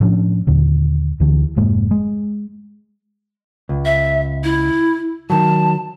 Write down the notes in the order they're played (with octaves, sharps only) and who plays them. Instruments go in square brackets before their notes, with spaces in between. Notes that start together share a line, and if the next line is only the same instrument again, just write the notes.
[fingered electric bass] A2 F3 C#4 D4
D#2 A#2 D3
D2 D3 E3
F1 G#2 G#3 A#3
G#3
[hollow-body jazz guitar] C#2
[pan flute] E5
E4
[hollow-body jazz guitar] D#3 F#3 [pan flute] A5